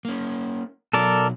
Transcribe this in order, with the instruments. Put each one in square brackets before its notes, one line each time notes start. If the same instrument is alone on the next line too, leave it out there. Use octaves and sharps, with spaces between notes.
[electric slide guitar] A#3 C#4
[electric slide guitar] B2 F#3 [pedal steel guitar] A4 A#4 D5